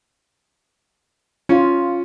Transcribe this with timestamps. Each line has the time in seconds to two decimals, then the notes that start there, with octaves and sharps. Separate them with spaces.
1.49 C#4 F4